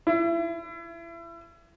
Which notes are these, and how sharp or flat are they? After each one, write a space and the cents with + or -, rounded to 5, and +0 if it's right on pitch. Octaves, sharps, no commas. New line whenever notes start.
E4 +30